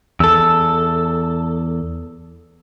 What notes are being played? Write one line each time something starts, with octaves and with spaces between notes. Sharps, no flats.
E2 A4 E6